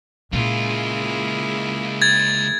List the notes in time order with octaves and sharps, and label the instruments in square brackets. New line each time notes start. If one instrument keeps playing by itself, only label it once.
[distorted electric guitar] C#2 F4 [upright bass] A#2 C#4 [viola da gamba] A#3 E4 G#4
[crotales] G#6 A6